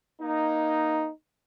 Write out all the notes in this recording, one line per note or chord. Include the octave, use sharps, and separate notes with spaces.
A#3 D#4